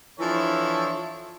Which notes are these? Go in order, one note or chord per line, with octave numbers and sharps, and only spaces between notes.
E3 F3 D4 E4 A4 C#5